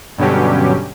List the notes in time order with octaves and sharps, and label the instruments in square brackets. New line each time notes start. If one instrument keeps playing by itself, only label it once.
[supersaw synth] G2 B2 D3 F#3 C#4 G4